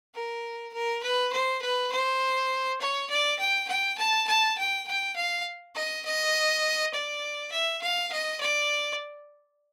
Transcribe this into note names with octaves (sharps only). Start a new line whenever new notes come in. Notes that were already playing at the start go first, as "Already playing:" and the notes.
A#4
A#4
B4
C5
B4
C5
C#5
D5
G5
G5
A5
A5
G5
G5
F5
D#5
D#5
D5
E5
F5
D#5
D5